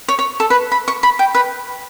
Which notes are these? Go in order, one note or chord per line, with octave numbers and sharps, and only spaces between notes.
C#5
C#5
A4
B4
B5
C#6
B5
G5
B4